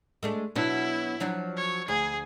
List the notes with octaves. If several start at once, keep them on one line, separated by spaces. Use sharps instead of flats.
G#3 A3 D4
B2 F#3 D4 E4
F3 F#3 D4
C#5
D2 G#4